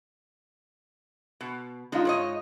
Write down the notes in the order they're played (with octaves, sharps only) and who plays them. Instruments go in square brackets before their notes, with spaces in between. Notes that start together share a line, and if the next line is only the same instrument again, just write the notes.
[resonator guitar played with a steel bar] B2
[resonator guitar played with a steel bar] G#3 D4 [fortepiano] D#4 F4
[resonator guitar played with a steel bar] G#2 C#5 D#5